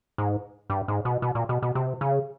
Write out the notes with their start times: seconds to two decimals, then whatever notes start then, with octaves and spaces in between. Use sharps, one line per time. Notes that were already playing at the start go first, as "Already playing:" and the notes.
0.18 G#2
0.70 G2
0.88 G#2
1.05 B2
1.22 B2
1.35 A#2
1.49 B2
1.62 B2
1.75 C3
2.01 C#3